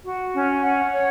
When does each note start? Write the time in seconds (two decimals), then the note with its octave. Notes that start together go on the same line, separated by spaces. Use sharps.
0.04 F#4
0.33 C#4
0.63 F#5
0.91 C#5